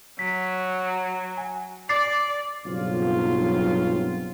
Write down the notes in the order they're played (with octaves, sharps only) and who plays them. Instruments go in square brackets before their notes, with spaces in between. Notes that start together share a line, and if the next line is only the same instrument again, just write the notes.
[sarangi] F#3 [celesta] B6
[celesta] G#5
[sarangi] D5 [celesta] D6 A6 C7
[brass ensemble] B1 G2 C#3 F#3 C4 F4